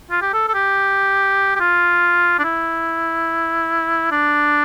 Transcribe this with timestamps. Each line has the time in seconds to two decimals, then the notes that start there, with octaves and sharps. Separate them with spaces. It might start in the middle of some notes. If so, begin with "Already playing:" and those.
0.11 F4
0.22 G4
0.34 A4
0.48 A4
0.54 G4
1.55 G4
1.60 F4
2.39 D4
2.44 E4
4.12 D4